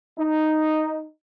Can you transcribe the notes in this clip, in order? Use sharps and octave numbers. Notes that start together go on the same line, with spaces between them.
D#4